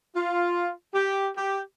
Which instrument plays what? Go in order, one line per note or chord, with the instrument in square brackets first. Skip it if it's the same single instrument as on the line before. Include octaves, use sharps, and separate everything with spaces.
[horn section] F4
G4
G4